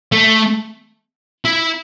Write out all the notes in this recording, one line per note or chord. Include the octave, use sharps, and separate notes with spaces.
A3
E4